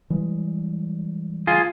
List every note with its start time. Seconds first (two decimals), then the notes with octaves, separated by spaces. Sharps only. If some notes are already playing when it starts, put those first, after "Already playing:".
0.10 E3 G3 G#3
1.47 F4 G#4